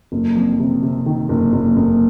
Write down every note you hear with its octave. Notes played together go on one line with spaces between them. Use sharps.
F#1
F2
C3
C3
D#3
F#1
F#1
F#1